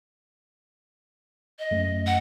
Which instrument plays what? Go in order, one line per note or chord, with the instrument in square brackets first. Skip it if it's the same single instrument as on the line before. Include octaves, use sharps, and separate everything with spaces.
[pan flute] D#5
[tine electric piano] F#2 A3
[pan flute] F#5